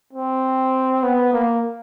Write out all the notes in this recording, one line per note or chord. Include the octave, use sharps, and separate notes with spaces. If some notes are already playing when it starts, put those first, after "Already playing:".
C4
B3
A#3